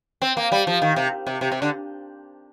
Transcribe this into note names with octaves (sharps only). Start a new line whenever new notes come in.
C4
A#3
G3
F3
D#3
C3
C3
C3
C3
D3